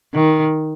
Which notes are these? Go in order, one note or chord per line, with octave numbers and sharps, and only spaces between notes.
D#3